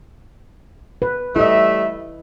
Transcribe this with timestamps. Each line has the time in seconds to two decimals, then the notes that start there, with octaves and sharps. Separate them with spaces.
1.02 B4
1.36 G3 A3 E4 D#5 E5